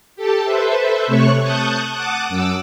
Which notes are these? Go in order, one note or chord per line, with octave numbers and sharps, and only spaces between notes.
G4 A4 A5
A4 B4 C5 E5
C3 A3 C#5 C#6 F#6
A5 C#6 D#6 F#6 G6
F#5 A5 D6 D#6 F#6
F#2 D6 E6